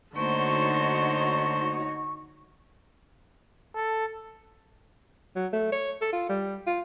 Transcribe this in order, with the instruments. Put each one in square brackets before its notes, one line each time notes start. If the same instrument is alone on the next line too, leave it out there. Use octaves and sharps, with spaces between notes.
[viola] D3 C5 [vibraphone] A3 A#3 [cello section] D#4 F#4 C#5 [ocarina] C#6
[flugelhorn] A4
[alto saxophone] F#3
A3
C#5
A4
F4
G3
F4